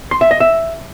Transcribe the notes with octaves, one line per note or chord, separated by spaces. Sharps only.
C6
E5
D#5
E5